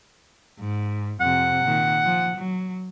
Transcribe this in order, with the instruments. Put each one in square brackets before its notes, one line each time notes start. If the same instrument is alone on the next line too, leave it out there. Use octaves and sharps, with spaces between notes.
[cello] G#2
[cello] F2 C3 [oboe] F#5
[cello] A#2 D#3
F3
F#3